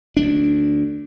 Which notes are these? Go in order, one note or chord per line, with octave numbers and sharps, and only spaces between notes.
D2 G3 D4